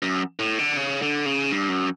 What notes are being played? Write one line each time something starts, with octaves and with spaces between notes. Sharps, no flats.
F#2
A2
D3
C#3
D3
C#3
G2
F#2